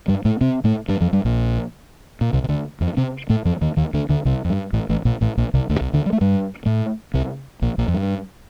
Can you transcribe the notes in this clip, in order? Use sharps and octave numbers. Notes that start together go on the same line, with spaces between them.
G2 G3
A2 A3
C3 C4
A2 A3
G2 G3
F2 F3
G2 G3
A#1 A#2
A#2
C2 C3
C3
D2 D3
F2 F3
C3 C4
A2 A3
F2 F3
D#2 D#3
D#2 D#3
D2 D3
D2 D3
C2 C3
F2
G2
A1 A2
A1 A2
A#1 A#2
A1 A2
A#1 A#2
C2 C3
D2 D3
C2 C3
D2 D3
G3
A3
G2 G3
A2 A3
C2 C3
A#1 A#2
A#1 A#2
F2
G2